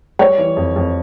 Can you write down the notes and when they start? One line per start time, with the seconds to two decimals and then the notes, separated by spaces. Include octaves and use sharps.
0.19 G3 C#5
0.38 E3
0.56 F2
0.76 F2